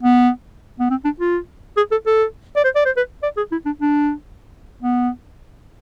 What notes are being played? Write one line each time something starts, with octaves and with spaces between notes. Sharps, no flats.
B3
B3
C4
D4
F4
G#4
A4
A4
D5
C5
D5
C5
B4
D5
G#4
E4
D4
D4
B3